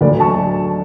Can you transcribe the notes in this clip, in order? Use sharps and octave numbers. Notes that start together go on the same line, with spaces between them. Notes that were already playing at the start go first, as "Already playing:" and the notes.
D2 D3 F#3 B4 D5
A5 C#6